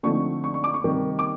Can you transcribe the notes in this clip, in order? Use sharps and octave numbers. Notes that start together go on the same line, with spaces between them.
D3 F3 A3 C4 D#4 C#6
C#6
C#6
D6
C#6
C3 D#3 G3 C4
D6